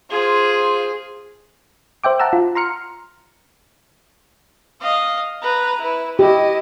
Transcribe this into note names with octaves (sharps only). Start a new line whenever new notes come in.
F4 G#4 C5
C5 E5 G5 D6
F#5 A5 A#5 E6
F4
A#5 C6 F6 C#7
D#5 F5
B4 A#5
E4 B4
E4 G4 D#5